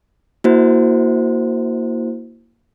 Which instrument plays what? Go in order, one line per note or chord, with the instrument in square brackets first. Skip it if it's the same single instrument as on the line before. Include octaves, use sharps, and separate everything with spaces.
[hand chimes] A#3 E4 F#4 C5